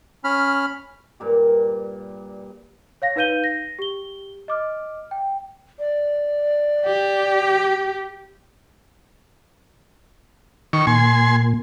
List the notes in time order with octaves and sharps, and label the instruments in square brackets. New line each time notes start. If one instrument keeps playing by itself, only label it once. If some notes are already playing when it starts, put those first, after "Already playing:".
[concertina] C#4 B5 F6
[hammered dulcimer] G2 A#2 G4
[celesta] C#5 F5 A#6
D#4 B4 F5 G6 D#7 G7
A#6
G4 G7
D#5 D6 F6
G5
[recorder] D5
[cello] G4
[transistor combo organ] D#3 C#6
[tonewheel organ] A#2 [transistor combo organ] G#5 C6